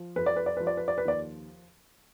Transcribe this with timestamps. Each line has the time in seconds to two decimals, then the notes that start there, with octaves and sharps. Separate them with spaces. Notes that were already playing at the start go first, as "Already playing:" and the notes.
Already playing: F3
0.16 F2 B4
0.26 D5
0.36 B4
0.46 D5
0.57 F3 B4
0.67 D5
0.77 B4
0.88 D5
0.98 B4
1.05 D#2 D5